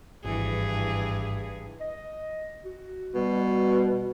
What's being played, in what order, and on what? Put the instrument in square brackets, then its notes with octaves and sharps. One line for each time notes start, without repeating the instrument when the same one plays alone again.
[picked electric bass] G#1 [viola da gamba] G2 E3 G#4
[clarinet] D#5
F#4
[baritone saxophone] B2 [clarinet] G3